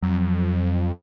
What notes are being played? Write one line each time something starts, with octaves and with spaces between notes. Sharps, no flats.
F2 F#3